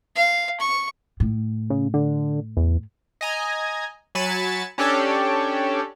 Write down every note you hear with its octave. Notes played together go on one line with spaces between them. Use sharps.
F5
C#6
A2
C#3
D3
E2
D#5 G#5 A#5
F#3 G#5 B5 A6 C#7 E7
C#4 D4 G4 A4 C#5 D5